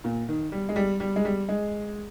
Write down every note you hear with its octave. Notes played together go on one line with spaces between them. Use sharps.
A#2
D#3
G3
G#3
G3
G3
G#3
G3
G#3